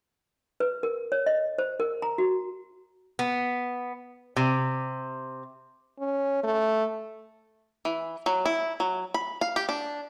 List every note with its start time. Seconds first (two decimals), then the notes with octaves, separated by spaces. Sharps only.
0.60 B4
0.83 A#4
1.12 C#5
1.26 D#5
1.58 C5
1.80 A#4
2.02 A#5
2.18 F#4
3.19 B3
4.36 C3
5.99 C#4
6.43 A3
7.85 E3
8.26 F#3
8.45 E4
8.80 F#3
9.14 B5
9.41 F5
9.56 G4
9.69 D4